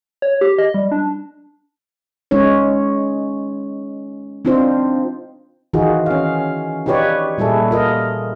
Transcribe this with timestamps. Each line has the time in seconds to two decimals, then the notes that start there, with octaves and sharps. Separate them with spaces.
0.22 C#5
0.41 G4
0.58 D#5
0.74 G3
0.92 D4
2.31 G#3 C#4 D#4 C#5
4.45 C4 D4 D#4 F4 C5
5.73 D#3 E3 D#4 F4 F#4 G#4
6.06 C#4 F5
6.86 D#4 F4 G4 B4 C#5 D5
7.38 A#2 G3 E4 G#4 A4
7.71 F4 A#4 D#5